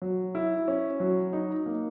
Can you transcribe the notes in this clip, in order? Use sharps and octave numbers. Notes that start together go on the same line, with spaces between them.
F#3
E4
C#4
F#3
D#4
A#3